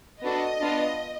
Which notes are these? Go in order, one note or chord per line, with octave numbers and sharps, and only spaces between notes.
B3 D4 F#4 A4 D#5
B3 D4 F4